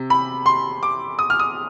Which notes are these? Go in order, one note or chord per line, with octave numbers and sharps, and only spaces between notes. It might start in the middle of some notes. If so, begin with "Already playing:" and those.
Already playing: C3
B5
C6
D6
D#6
F6
D#6